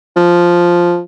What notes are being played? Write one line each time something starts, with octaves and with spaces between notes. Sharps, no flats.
F3